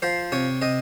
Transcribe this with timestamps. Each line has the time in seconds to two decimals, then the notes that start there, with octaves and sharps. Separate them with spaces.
0.02 F3 C5
0.32 C3 C#5
0.62 C3 D#5